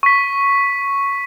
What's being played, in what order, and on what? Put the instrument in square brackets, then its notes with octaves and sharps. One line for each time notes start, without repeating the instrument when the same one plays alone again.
[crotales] C#6 B6